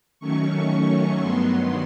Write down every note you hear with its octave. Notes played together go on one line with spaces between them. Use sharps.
D#3 F#3 A3 C#4 C#6
G2 D#3 F#3 B3 C6